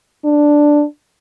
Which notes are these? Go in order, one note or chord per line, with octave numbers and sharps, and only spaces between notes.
D4